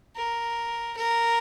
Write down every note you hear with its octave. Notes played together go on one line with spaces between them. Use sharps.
A#4
A#4